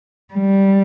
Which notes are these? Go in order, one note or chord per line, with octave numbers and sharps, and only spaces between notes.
G3